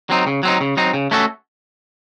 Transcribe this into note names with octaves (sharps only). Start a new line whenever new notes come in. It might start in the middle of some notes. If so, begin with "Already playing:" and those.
F#3 C4 D#4
C#3
F#3 C4 D#4
C#3
F#3 C4 D#4
C#3
A3 C#4 F#4 A4